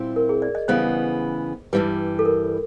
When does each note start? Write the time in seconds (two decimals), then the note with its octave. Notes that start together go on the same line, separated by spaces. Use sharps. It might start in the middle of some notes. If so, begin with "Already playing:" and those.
Already playing: A#2 G3 C4 E4
0.16 A#4
0.29 G#4
0.42 D5
0.55 D#5
0.68 C#3 E3 G3 B3 C5
1.73 G2 E3 G3 B4
2.19 A4
2.25 A#4